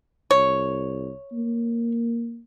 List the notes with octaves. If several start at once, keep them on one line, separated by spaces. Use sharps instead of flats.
C2 C#5
A#3